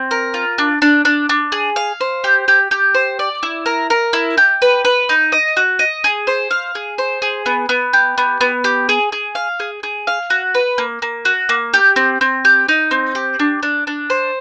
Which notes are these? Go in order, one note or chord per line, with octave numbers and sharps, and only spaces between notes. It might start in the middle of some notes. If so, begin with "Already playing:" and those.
Already playing: C4
A#4
F4
D4
D4
D4
D4
G#4
F5
C5
G4
G4
G4
C5
D5
E4
A#4
A#4
E4
G4
B4
B4
D#4
D#5
F#4
D#5
G#4
C5
F5
G#4
C5
G#4
B3
B3
G4
B3
B3
G4
G#4
G#4
F5
G#4
G#4
F5
F#4
B4
A#3
A#3
F#4
A#3
G4
C4
C4
G4
D#4
C4
G4
D4
D4
D4
C5